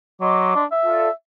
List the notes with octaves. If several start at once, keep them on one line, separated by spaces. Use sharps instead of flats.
F#3 D#5 C6 D6
D4
E5
F4 A4 D5